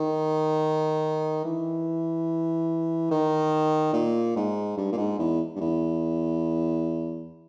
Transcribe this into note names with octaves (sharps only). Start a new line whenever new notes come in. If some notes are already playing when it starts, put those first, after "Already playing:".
Already playing: D#3
E3
D#3
A#2
G#2
G2
A#2
G#2
E2
G2
E2